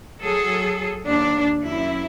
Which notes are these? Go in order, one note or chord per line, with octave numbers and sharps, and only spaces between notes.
F#3 G#4 A4
D#2 D4
F#2 E4